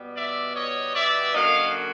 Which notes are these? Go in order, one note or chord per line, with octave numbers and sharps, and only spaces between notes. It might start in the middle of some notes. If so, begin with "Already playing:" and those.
Already playing: B2 G3 B3
D5 E5
C#5 D#5
D5 E5
F#2 D3 F#3 A#3 D#5 F5